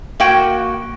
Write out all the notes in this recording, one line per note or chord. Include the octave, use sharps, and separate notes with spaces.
A#3 F#4 G5